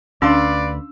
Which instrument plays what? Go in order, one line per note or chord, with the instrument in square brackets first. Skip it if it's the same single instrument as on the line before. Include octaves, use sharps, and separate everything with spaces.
[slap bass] D2 [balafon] C#4 D4 [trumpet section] B4 D5 [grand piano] F5 C6 E6